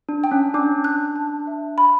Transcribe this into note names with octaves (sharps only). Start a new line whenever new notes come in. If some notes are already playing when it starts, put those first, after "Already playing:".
D4
G5
C#4
D4 D6
F#6
A5
E5
B5